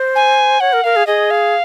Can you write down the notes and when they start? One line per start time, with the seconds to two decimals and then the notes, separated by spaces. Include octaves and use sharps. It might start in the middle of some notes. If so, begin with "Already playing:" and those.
Already playing: C5
0.15 G#5
0.60 C#5 F#5
0.73 A#4
0.84 A#4 F5
0.96 G#4
1.07 G#4 D#5
1.30 F5